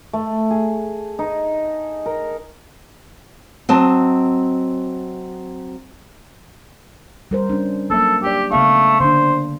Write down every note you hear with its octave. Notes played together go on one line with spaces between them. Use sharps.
A3
G#4
D#4
A#4
F#3 C4 D#5 A5
G3 A#4 C5
C#4 D4
F#3 A#3 A4 E5
D4 G4 D5
C#3 A3 B3 F5
D3 A#3 D4 C5